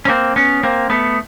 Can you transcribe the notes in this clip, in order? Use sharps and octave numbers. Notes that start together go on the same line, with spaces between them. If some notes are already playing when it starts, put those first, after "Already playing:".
C#4
A#3 C4
B3 C#4
A#3 C4
A3 B3